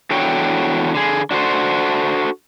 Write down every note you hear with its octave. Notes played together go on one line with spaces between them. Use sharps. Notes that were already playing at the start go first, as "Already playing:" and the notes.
E2 D4 F#4 A4 C#5 G5
D3 G#4
D4 F#4 A4 C5